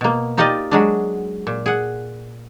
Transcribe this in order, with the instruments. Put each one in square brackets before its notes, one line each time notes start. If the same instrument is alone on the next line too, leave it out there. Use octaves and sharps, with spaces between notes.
[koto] B2 A#3
D#4 F4 G4 A#4 D5 D#5
F#3 G#3 D4
A#2
G#4 F#5